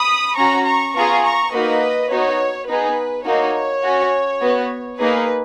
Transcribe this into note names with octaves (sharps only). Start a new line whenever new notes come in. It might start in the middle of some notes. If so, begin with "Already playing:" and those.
Already playing: B5 D#6
C#4 F#4 A#5 C#6
A#5 C#6
B3 F4 G#4 A#5 C#6
A#5 C#6
A#3 D#4 F#4 B4 D#5
B3 D#4 F#4 C#5
B3 D#4 G#4 B4
A#3 D#4 F#4 C#5
C#4 F#4
B3 F#4
A#3 D#4 G#4 B4